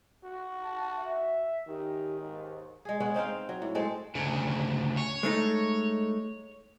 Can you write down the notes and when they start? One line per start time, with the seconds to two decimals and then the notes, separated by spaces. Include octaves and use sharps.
0.24 F#4
0.62 A5
0.97 E5
1.68 D#3 C#4 D#4 G4
2.19 D#2 G#2
2.85 G#3 G#4
3.00 G#3 B3 C#4
3.14 C4 D#4 F5 G5
3.49 F#3
3.62 A2
3.75 G#3 C4 A4
4.15 D2 C#3
4.97 C#5
5.23 G#3 A3 D#4